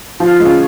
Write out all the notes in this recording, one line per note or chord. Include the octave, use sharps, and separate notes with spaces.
F3 F4
G#3
C#4